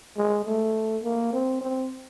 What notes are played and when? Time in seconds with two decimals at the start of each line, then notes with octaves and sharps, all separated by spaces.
0.17 G#3
0.45 A3
1.03 A#3
1.33 C4
1.61 C4